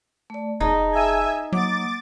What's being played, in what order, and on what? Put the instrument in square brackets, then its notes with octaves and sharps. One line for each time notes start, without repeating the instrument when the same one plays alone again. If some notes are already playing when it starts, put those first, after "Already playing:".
[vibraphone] A3 D5
[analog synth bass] F1 [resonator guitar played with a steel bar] D#4 [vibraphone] G#4 A5
[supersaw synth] E5 G#5
[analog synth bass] F#3 [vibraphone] A#3 F#5 D#6 [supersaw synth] D6 A6